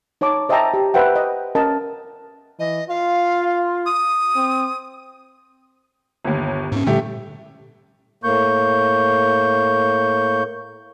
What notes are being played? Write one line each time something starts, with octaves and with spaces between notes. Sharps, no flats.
D#4 C#5 A5 D6
C5 D#5 E5 G5 A5 A#5
G4
B4 C5 E5 F#5 G5
D#5
C#4 A#4 D#5 A5
E3 D#5
F4 F5
D#6
C4
G1 D#2
G#2 C#4
A#2 D3 G3 A3 G4
A2 A#3 C#6 G6